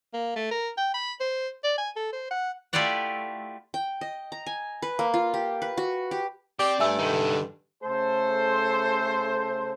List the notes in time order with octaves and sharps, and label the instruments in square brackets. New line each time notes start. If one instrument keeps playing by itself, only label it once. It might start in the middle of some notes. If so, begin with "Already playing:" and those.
[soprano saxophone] A#3
A3
A#4
G5
B5
C5
D5
G#5
A4
C5
F#5
[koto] A3 E4 F4 G4 D5 F#5
[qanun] G5
D#5
A#5
G#5
B4
A#3
F4
G4
B4
F#4
G4
[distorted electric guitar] C4 [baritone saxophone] G4 [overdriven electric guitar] D5 [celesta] D6
[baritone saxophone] G2 [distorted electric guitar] A3 [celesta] E5 G#5 E6
[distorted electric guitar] D#3 [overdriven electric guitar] D#4 A4
[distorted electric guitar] D3
[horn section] C#3 A3 A4 C5